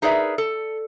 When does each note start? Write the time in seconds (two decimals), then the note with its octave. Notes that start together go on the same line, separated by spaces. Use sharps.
0.02 D#4 G#4 A#4 B4 D5 E5
0.38 A4